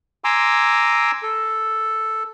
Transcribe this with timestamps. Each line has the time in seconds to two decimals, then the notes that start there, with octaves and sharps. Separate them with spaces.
0.24 G#5 A#5 C6 D6 E6
1.23 A4